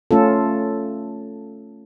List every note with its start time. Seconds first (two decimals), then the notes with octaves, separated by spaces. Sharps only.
0.11 A3 C#4 F4 A4